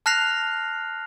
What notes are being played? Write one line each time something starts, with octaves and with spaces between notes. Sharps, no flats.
A5 F6 F#6 A#6 C7 F7